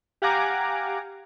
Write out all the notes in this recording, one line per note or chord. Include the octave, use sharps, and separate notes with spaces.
G4 F5 F#5 G#5 A#5 D6